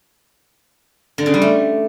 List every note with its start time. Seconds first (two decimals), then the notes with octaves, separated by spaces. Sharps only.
1.18 D3
1.26 C#3
1.34 G3
1.42 A3